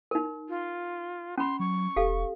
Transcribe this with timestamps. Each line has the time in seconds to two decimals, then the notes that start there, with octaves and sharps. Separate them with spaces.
0.11 D#4 A#4
0.49 F4
1.38 C#4 B5 C6
1.60 F#3 C#6
1.96 E1 G4 A4 F5